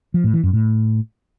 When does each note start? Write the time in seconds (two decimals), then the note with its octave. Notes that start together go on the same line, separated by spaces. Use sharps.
0.14 F3
0.24 A2
0.34 E3
0.43 F#2
0.53 A2